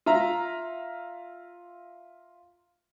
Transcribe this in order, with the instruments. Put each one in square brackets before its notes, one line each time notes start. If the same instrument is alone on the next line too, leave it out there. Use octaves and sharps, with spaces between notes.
[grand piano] F4 E5 A#5